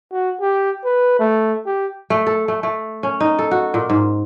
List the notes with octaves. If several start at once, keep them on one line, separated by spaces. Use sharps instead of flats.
F#4
G4
B4
A3
G4
A3
A4
A3
A3
C#4
D#4
A4
F#4
A#2
G#2